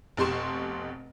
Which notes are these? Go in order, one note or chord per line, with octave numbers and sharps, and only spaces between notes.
F1 B2 G4 C6 C#6 E7